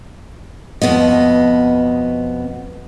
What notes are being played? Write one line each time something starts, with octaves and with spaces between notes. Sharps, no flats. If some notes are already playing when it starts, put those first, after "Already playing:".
F2 B2 B3 D#5